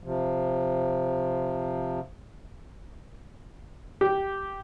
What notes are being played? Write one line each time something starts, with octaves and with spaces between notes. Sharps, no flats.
C3 F3
G4